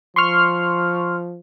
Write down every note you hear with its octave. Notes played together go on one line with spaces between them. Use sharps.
F3 C6 C#6 F6